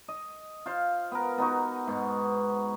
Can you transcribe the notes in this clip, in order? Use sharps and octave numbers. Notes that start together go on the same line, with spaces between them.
D#5
F4 C5 F5
B3 A#4
B3 D#4 F#4
G#2 B2